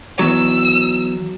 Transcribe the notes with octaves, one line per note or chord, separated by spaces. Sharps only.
D#3 E3 F#3 B3 E6